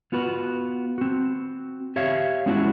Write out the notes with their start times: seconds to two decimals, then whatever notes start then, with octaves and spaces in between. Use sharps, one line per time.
0.12 B3 F4 F#4 B4
0.98 C4 F#4
1.96 G4 C#5 E5 F5
2.46 G#3 B3 C#4 D4 E4 F#4